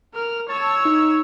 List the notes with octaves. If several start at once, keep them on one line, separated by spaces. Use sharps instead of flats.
A#4 F6
C#5 A5 E6
D#4